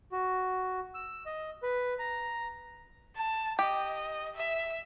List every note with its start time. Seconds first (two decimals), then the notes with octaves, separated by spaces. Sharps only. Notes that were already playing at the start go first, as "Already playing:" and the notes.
0.12 F#4
0.94 E6
1.26 D#5
1.63 B4
1.99 A#5
3.17 A5
3.59 G4 D#5
4.35 E5